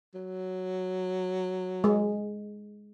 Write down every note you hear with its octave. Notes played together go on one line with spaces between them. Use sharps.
F#3
G#3